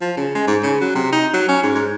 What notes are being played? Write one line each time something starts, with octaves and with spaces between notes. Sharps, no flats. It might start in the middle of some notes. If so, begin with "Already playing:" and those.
F3
C#3
G#3
G#2
C#3
F#3
C3
D#4
F#3
C#4
G#2
G#2